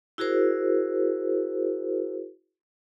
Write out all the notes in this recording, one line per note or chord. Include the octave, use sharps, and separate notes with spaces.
E4 F#4 G#4 A#4 C5